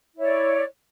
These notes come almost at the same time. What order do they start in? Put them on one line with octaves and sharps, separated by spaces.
E4 C#5 D5